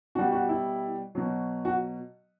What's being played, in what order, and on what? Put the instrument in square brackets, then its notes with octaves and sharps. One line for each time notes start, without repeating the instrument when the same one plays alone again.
[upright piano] B2 F#4
G3
F#4
E4
B2 F#3
F#4